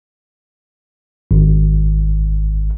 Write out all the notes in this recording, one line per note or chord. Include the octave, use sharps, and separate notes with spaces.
G#1